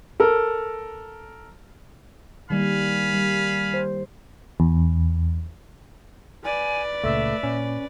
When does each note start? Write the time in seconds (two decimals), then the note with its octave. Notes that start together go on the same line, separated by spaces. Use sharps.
0.20 A4 A#4
2.50 D#3 G3 A#3 F5 G#5 B5
3.13 G3
3.74 C5
4.60 E2
6.44 B4 D5 G#5
7.04 C#2 A#2 C#3 A3 E5
7.43 A#2 C#4